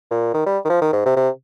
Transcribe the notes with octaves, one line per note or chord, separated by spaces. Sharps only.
A#2
D#3
G3
D#3
F3
D#3
G#2
C3
C3